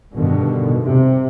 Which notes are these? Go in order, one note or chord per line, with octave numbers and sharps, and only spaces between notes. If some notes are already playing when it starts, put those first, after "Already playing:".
G2 B2 D3 D#3
C3